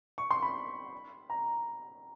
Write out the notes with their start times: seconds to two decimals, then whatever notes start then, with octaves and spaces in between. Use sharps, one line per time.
0.18 C#6
0.31 C6
0.42 B5
1.30 A#5